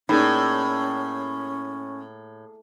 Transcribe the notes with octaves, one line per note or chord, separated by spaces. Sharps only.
A2 A#3 C#4 D#4 G#4 D5